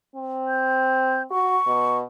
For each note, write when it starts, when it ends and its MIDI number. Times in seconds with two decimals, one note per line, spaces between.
0.16 1.25 60
0.48 1.23 91
1.31 1.57 66
1.31 1.98 85
1.67 2.02 47